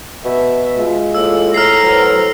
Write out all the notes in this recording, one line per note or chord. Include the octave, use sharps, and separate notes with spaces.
B2 E5
G#3 F4
A2 A#3 E6
A2 A#5 F6 C7
F#3 B4 C5